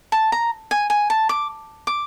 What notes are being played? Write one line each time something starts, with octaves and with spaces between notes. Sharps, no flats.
A5
A#5
G#5
G#5
A5
D6
D6